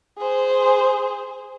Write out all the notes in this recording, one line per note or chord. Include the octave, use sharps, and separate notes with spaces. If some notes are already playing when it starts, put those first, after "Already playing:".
G#4 C5